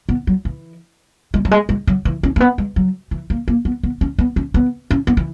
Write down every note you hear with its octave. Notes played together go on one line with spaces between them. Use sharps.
B3
F#3
E3
G#3
F#3
G#3
G#3
F#3
E3
C#4
A#3
B3
G#3
F#3
E3
A#3
A#3
B3
B3
C#4
B3
C#4
B3
C#4
B3
E3